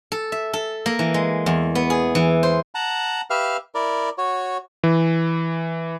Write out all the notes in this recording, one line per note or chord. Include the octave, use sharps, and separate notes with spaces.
A4
E5
A4
A#3
E3
G#3
E2
B3
G#4
E3
C5
F#5 A5 A#5
G4 B4 E5 F5 F6
E4 A#4 D5
F#4 C#5
E3